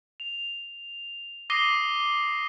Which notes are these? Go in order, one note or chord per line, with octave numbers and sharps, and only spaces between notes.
F7
D6 D#6 A#6 C7 D#7 G7